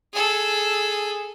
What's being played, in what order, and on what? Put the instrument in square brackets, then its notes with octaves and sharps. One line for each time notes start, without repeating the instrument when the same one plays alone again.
[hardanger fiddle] G#4 A4